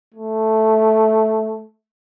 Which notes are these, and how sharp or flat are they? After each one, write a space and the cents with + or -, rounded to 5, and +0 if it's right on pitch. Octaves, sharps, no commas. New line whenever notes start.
A3 -5